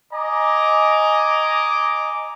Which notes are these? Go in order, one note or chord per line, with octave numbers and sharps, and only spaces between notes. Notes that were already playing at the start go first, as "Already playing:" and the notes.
D#5 G#5 A#5 D6